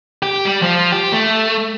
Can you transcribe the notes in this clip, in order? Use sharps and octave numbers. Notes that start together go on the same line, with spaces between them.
G4
G3
F3
G4
A3